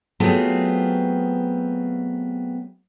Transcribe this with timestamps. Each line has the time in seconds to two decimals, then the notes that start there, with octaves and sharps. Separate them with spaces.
0.20 F#3 A3 B3 C4 F4 G#4